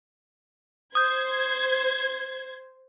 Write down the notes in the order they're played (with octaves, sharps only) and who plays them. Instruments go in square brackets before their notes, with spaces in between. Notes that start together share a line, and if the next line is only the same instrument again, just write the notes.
[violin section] C5 G#6 [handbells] D#6 G6